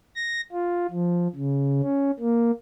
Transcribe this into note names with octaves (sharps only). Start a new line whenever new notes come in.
A#6
F4
F3
C#3
C#4
A#3